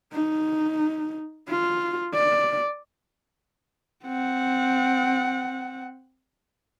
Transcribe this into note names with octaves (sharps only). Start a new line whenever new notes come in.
D#4
F4
D5
C4 F#5